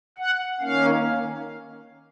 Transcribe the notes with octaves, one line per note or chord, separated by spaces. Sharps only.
F#5
D#3 A#3 C#4 F5